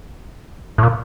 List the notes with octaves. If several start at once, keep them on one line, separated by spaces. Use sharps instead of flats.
A2
A#2